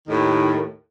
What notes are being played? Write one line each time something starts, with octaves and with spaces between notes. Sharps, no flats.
D#2 A2 D#3